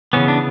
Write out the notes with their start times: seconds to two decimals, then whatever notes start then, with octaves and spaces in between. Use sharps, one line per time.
0.13 C#3 E3 B3 C#4
0.28 D4